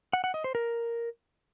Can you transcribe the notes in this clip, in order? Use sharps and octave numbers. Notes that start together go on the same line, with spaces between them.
F#5
F#5
D#5
C5
A#4